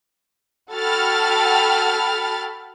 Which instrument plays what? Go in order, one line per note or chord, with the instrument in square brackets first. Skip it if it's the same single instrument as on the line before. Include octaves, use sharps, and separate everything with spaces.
[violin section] F#4 A4 G5 B5 F6 A6